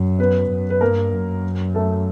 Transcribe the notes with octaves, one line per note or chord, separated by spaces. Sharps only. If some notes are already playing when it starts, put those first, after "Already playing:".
Already playing: F#2
B3 B4
F#2
B4
G2 A#3 A#4
F#2
A3 A4